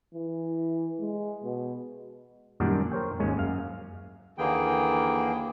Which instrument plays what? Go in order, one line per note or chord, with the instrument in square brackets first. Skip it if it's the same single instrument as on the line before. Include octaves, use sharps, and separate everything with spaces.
[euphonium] E3
G#3
B2
[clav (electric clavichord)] F#2 A#2 D#3 G3 D4 F#5
A#4 C5 C#5 G5
G#1 D#2 G#3 C#4
F#2 F5
[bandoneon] D#2 D3 E3 A#3 G#4 G5